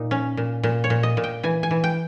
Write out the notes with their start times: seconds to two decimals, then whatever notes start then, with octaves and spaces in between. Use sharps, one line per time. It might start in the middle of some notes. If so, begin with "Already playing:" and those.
Already playing: A#2 D#4
0.11 C#4
0.37 A#2
0.63 A#2
0.84 C#5
0.90 A#2
1.03 D#5
1.17 A#2
1.24 G5
1.43 E3 G#5
1.63 G#5
1.71 E3
1.84 G5